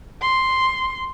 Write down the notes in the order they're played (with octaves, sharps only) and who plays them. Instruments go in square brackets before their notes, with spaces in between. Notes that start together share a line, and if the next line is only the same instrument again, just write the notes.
[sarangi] C6